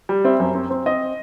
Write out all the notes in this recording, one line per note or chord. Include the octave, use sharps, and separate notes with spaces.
G3
C4 E5
F#2
C4
C4
C4 D#5